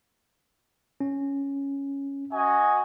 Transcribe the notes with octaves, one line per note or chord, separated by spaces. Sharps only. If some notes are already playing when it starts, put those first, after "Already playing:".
C#4
F#4 D#5 G#5